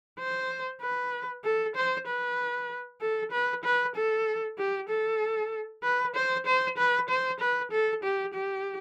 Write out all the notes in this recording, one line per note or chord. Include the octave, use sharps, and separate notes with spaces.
C5
B4
A4
C5
B4
A4
B4
B4
A4
G4
A4
B4
C5
C5
B4
C5
B4
A4
G4
G4